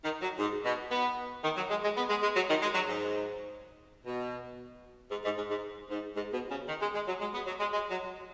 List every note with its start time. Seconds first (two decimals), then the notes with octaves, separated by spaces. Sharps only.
0.04 D#3
0.22 F#3
0.39 G#2
0.65 B2
0.91 B3
1.44 D#3
1.57 F#3
1.70 G#3
1.83 G#3
1.97 B3
2.10 G#3
2.22 G#3
2.36 F#3
2.49 D#3
2.62 G#3
2.74 F#3
2.88 G#2
4.06 B2
5.11 G#2
5.24 G#2
5.37 G#2
5.50 G#2
5.90 G#2
6.16 G#2
6.33 B2
6.51 C#3
6.68 D#3
6.81 G#3
6.95 G#3
7.08 F#3
7.21 G#3
7.34 B3
7.47 F#3
7.60 G#3
7.73 G#3
7.91 F#3